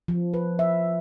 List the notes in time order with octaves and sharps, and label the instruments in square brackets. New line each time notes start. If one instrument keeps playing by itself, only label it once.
[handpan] F3
B4
E5